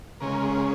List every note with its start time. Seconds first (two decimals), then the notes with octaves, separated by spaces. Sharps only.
0.20 C#3 G#3 C#4 A#4
0.44 G#4
0.57 A#4